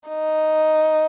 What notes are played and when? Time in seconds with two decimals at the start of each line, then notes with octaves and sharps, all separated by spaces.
0.09 D#4